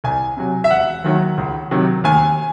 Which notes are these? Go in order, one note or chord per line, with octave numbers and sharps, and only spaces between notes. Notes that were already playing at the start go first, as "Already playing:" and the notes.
C2 G#5
C3 F#3
E5
E1 F#5
D#2 D#3 F#3
C#2
C3 D#3 F#3
D#2 G#5